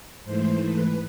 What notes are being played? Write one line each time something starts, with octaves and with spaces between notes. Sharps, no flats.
G#2 E3 A3 C5
B4